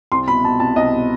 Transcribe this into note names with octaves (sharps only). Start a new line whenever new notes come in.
C2 C6
B2 B5
B2 A5
C2 A5
C2 D#5
B2